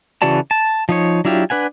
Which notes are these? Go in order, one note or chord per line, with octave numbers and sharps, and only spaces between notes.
C#3 E3 F#4 D5 A5
A5
F3 D#4 C#5
F#3 D4 E4 F4 G4
D4 B4 F#5 G#5